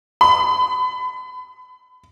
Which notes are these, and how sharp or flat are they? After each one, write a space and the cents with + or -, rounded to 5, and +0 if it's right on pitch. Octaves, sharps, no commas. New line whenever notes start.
B5 +35